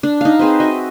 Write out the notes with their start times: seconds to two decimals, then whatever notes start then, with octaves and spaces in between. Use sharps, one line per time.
0.03 D4
0.21 D#4 F5
0.39 C4 G#4 B4 C5
0.60 F#4 D#5 E5